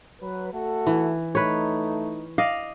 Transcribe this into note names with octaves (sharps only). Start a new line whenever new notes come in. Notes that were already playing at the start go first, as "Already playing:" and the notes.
F#3 B4
A3 F#4 A4
E3
A3 D#4 B4 C#5
D5 D#5 F5